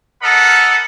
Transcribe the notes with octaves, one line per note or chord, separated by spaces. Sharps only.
A4 A#4 D#5 F#5 B5